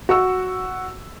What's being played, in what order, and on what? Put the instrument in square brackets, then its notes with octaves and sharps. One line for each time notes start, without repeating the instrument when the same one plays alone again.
[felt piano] F#4 C#6 E6